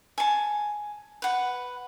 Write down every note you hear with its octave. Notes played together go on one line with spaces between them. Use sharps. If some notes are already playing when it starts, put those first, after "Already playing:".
G#5 A5
B4 F#5